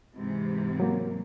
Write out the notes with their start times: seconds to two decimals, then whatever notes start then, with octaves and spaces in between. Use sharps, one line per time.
0.15 G#2 C3 E3
0.80 F#3 A#3